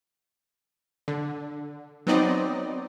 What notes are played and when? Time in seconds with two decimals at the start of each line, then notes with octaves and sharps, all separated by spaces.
1.08 D3
2.07 F#3 B3 C4 D#4 D5 D#5